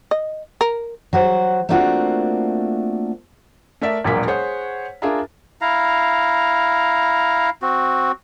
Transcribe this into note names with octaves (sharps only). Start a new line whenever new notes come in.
D#5
A#4
F#3 F#4 C5
A3 A#3 C4 D4 F4 F#4
A3 A#4 D5 E5 B6
E1 A#1 A#2 F#3 A#3 B6
G#4 C5 C#5 F#5
D4 F4 G#4 A#4 E5 A#5
E4 F5 A#5
C4 F#4